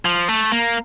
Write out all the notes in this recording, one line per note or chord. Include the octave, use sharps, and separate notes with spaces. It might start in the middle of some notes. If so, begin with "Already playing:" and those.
F3
A3
A#3